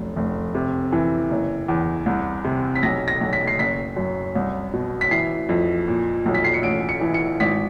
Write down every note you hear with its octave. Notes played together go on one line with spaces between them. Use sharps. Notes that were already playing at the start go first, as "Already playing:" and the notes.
Already playing: F1 F#2
F1
C3
E3
F#1
E2
C2
C3
B6
B1 A#6
A#6
B1
B6
C7
F#1 B6
F#2
C2
B2
B6
E3 C7
F2
A#2
B1
B6
C7
C#7
A1 D7
C#7
E3
C#7
G#1 B6